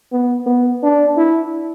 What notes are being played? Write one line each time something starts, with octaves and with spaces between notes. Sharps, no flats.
B3
B3
D4
E4